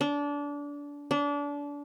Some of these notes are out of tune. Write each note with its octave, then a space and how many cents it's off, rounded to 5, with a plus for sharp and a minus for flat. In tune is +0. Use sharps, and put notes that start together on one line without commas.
D4 -25
D4 -30